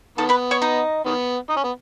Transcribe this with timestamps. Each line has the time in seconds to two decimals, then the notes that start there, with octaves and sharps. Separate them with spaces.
0.18 D#3 B3 A4 A5
0.29 B4 B5
0.51 C#5 C#6
0.62 D#4 D#5
1.06 D#3 B3
1.49 D#4
1.56 C#4
1.64 B3